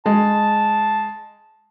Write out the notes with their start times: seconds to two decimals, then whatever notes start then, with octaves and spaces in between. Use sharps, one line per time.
0.06 G#3 A5